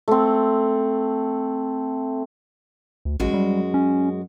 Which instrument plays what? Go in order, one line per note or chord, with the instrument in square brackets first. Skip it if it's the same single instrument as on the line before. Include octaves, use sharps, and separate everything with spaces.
[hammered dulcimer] A3 C4
[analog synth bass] D2
[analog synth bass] A1 [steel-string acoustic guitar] F#2 G#3 F#4
[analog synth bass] G3
C#4